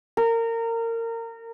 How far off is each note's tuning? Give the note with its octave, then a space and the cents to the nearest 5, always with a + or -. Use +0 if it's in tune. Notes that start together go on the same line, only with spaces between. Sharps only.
A#4 -25